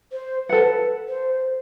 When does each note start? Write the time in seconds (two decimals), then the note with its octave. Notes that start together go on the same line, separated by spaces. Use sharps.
0.12 C5
0.49 A4 B4 F#5
1.08 C5